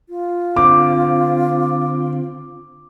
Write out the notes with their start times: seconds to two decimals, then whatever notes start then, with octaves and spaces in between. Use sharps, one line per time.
0.09 F4
0.56 D3 C4 D6